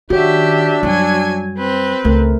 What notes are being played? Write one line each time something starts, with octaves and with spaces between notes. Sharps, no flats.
D#3 D4 F#4 G4 C#5 E5
F#2 F#3 G3 G#5
C4 B4
C#2 A3 A#4